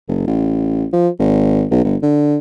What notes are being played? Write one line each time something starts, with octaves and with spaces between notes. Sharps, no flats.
F#1
A1
F3
G#1
B1
G1
D3